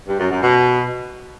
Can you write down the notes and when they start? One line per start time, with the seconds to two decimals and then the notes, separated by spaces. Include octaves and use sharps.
0.08 G2
0.19 F#2
0.31 F#2
0.42 B2